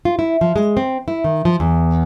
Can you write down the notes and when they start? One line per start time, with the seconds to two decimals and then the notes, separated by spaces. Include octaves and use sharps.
0.05 F4
0.19 E4
0.41 F3
0.56 G#3
0.77 C4
1.08 E4
1.24 D#3
1.45 F3
1.60 E2